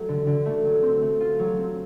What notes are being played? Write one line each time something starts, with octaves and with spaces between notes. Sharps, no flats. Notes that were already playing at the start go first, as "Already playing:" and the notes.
Already playing: F#3 A3
D3
D3
A3
F#3
C4
A3
F4
F#3
C4